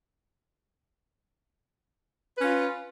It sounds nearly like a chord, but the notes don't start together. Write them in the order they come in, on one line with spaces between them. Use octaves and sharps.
B4 C#4 F4